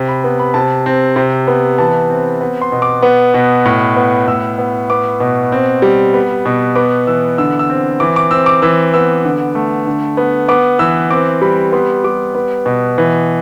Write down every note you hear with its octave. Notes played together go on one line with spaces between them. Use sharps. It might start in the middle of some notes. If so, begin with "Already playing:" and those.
Already playing: C3
B5
B3
B5
C3 A5
C4
C3
B3
E3 A5
C4
B3
C6
B2
D6
B3
B2
A2
B3
A2 E6
B3
B3 D6
B2
C4
G3
B3
B2
B3 D6
E3 E6
D3 E6
E6
C4
E3 D6
D6
C4 E6
D6
E3 E6
B3 E6
D3
A3
D3
B3
B3 D6
E3 E6
C4 D6
G3 B5
B3 C6
G3 D6
B3
B2
E3